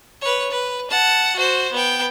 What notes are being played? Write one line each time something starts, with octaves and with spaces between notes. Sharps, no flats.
B4 C#5
B4
F#5 A5
F#4 C5
B3 G5